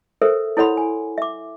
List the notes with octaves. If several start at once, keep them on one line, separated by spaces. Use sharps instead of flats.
A4 A#4 C5 E5
E4 A4 C#5 F#5 B5 C6
G#5
E5 D6